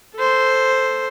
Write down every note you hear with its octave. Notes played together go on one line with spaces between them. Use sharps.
A4 C5